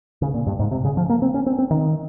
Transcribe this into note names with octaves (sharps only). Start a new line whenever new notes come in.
C#3
A#2
G2
G#2
C3
C#3
F3
A#3
C4
C#4
C4
C4
D#3